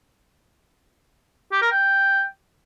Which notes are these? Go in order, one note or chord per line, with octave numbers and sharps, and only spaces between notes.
G4
A#4
G5